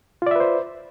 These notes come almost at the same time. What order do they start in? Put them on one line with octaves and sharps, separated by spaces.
F4 D5 E5 B4 C5